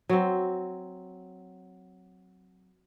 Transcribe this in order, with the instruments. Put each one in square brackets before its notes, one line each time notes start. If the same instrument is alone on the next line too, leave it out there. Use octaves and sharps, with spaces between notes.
[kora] F#3 C4